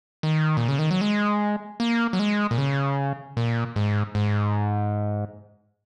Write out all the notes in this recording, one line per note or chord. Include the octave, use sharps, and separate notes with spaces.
D#3
A#2
C#3
D#3
F#3
G#3
A#3
F#3
G#3
A#2
C#3
A#2
G#2
G#2